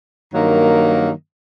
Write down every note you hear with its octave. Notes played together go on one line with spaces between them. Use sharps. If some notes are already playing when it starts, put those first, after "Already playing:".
G2 D#3 F#3 A#3